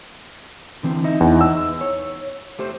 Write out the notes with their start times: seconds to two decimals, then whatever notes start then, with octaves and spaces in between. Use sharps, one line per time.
0.83 D3 E3 C4
1.04 D#4 D#5 E5
1.21 E2
1.41 E6
1.81 C#5
2.59 A3 G4 C5